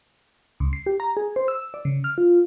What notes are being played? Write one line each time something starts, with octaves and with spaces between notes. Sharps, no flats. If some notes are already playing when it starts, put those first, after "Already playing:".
C#2
C7
G4
A#5
G#4
C5
E6
D5
C#3
F6
F4